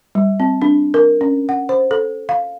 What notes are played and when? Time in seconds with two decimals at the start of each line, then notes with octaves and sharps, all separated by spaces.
0.15 G3
0.40 C4
0.62 D4
0.94 A#4
1.21 C#4
1.49 F#5
1.69 C5
1.91 A4
2.29 F5